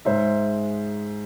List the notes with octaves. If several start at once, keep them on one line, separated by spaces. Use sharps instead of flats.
G#2 G#3 C5 E5